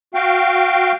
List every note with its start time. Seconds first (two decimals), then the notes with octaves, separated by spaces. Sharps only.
0.14 F#4 F5 G5